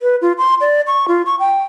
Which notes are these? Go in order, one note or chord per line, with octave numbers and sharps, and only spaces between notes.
B4
F4
C6
D5
C#6
F4
C#6
G5